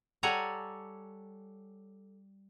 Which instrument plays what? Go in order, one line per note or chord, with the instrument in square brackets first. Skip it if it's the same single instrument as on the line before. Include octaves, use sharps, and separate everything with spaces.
[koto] G3 A4 C#5 F#5 G#5 A#5